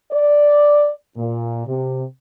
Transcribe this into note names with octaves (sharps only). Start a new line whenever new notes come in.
D5
A#2
C3